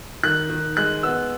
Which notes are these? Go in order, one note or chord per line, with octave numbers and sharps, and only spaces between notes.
D#3 F#6
D#3
G#3 F#6
B3 E6